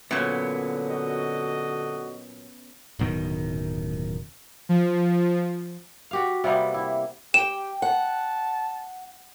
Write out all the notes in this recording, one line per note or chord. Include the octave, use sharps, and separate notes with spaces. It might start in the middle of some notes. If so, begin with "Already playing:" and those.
A#2 D3 F#3 B3 C#4
F#4 D#5
D1 F#2 B2 D#3
F3
F#4 G4 F5
C3 G3 A#3 B3
E4
G4 G5 E7
F#5 A5